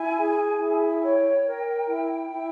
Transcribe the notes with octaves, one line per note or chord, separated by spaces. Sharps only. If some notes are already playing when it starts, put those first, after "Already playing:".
Already playing: E4 G#5
G#4
E4
C#5 G5
A#4
E4
E4